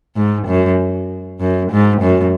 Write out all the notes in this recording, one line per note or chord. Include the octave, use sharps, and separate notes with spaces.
G#2
F#2
F#2
G#2
F#2